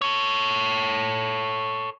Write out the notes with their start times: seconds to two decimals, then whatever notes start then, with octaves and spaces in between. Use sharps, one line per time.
0.02 A4 C#5